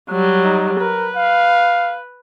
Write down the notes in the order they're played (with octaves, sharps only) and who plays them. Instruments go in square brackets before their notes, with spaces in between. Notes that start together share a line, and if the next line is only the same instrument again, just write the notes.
[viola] F#3 G3
[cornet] D#4
[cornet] A#4 [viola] B4
[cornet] F5